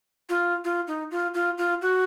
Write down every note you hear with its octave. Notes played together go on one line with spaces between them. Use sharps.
F4
F4
D#4
F4
F4
F4
F#4